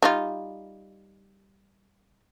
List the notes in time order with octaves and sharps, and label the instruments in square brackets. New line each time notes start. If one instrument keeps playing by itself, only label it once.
[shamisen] G3 D#4 F4